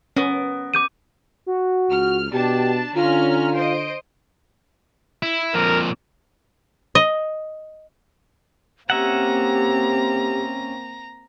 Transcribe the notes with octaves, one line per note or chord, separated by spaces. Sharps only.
B3 C#4 A#4
D6 G6 D#7
F#4
C#2 F6
B2 D4 G4 A5
D3 C#4 F4 A#5 F6
C5 D#5 D7
E4
F2 A#2 A#4
D#5
A#3 C4 C#4 G4 E5 F#5 A#5